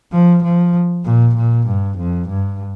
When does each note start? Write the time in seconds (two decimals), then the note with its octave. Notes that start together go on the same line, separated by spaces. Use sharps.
0.12 F3
0.43 F3
1.05 A#2
1.37 A#2
1.67 G2
1.98 F2
2.28 G2